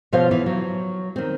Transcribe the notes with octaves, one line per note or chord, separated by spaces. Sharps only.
B2 F3 F4 C5 C#5 F5
E3
F#3
D#3 C4